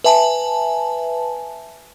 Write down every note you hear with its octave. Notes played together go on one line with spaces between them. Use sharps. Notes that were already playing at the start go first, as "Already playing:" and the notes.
B4 E5 G#5 A5